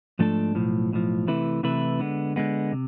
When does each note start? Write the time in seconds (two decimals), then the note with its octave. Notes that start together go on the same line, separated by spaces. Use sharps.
0.19 G#2 F3 A3 D4 A4
0.55 B1 A2 F3
0.91 B1 A2 F3
1.28 C3 E3 A3 E4 B4
1.63 C3 E3 A3 E4 B4
2.00 D3 G#3 B3
2.36 D3 G#3 B3
2.72 C3